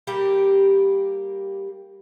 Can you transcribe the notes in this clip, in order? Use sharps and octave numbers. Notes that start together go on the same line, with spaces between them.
G3 A#3 G4 G5